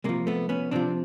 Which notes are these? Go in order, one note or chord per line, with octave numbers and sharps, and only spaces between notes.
C3 F3 G#3 A#3
A3 B3
B3 C#4
C3 F3 C4 D4